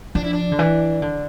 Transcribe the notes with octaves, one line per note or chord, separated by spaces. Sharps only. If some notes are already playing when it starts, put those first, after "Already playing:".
F3 D4
E4
D4
D3
E3
D3